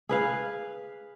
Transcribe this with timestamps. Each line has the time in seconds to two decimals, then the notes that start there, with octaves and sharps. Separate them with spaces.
0.09 G#4 B4 F5